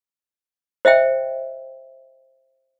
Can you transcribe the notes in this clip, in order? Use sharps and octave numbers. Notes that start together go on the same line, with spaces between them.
C5 D#5 E5 G5